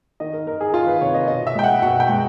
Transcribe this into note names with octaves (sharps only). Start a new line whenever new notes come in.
D#3 D#5
A#4
D#3 A#4
G#4
D#3 F4
B4
C3 C#5
D#5
B2 D#5
E5
G#3 G5
F#5
B2 F#5
G5
G#3